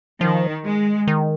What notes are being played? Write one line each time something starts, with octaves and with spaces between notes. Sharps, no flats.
D#3 F3
G#3
D#3